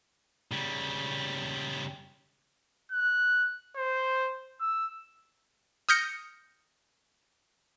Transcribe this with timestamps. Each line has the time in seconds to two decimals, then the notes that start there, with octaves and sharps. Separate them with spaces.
0.52 C#3 G3
2.92 F#6
3.77 C5
4.61 E6
5.89 D#6 F6 G6 A#6 C#7